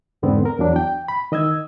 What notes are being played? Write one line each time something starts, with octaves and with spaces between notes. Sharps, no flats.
E2 G#2 D3 B3 C4
A#4
E2 F#3 D4
G5
B5
D#3 D#5 E6 G#6